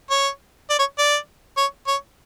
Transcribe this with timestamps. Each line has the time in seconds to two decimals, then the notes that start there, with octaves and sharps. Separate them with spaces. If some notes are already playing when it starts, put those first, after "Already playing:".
0.10 C#5
0.70 D5
0.79 C#5
0.98 D5
1.57 C#5
1.87 C#5